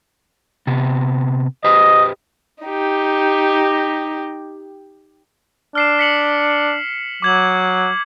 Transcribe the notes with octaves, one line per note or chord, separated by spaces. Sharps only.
C3 B3
G4 B4 C5 D#5
D#4 G4
D4 F6 C7 E7
B6 C#7 F#7
F#3 D6 G#6 F#7